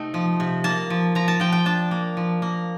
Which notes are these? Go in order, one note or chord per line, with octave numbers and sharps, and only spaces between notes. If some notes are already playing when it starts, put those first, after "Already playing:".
Already playing: C3 A3 D#4 G5
F3
C3
A#3 A5
F3
F3 A#5
A5
F3 G5
G5
D4 A5
A#3
F3
A#3